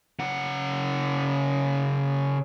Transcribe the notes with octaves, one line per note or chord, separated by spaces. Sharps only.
C#3 F#5